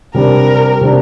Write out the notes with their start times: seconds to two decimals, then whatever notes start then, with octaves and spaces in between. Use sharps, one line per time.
0.14 C3 G3 D4 A#4
0.81 C3 G3 D4